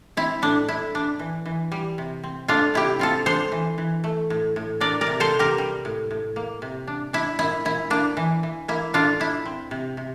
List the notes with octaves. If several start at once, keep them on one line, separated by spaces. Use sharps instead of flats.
C4 E4
A2 D4
A2 E4
D4
E3
E3
G3
C3
C4
A3 D4 F4
C3 E4 G4
C4 F4 A4
D4 A4 C5
E3
E3
A3
A2
A2
D4 A#4 D5
A#4 D5
C3
A4 C5
C3
G4 A#4
G3
A2
A2
A#3
C3
D4
D4 E4
A#2 E4
A#2 E4
A#3 D4
E3
E3
A#3 E4
A2 D4 F4
D4 E4
C4
C3
C3